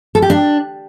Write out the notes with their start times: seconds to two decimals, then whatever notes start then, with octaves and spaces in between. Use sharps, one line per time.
0.15 A4
0.22 G4
0.30 D4